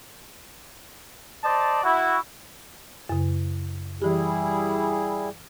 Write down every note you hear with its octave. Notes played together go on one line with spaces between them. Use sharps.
C5 D5 D#5 A5
E4 F#4
F#2 C#3
E3 G3 E4 G4 G#4